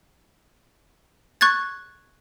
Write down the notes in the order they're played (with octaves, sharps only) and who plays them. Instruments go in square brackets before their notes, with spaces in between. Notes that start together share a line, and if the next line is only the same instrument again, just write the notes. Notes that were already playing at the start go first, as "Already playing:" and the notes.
[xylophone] C#6 F#6 G#6 A6